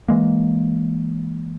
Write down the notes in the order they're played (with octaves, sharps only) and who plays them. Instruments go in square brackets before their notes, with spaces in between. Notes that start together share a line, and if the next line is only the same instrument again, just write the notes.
[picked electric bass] E3 G#3 A#3